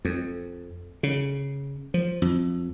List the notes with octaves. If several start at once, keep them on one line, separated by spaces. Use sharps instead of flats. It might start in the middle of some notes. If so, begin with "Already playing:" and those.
F2
C#3
F3
F2